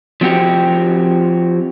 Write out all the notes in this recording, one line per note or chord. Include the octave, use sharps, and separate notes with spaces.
F3 C4 F#4 G4